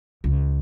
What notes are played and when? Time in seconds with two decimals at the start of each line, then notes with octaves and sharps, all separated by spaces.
0.24 C#2